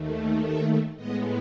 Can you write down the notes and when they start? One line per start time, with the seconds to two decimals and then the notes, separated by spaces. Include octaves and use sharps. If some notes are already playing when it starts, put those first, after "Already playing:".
Already playing: D#2 D#3 A3
0.42 E5
0.96 A2 G#3 B3 D#5